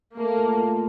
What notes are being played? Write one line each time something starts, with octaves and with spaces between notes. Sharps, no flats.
A3 A#3
A#2
A#2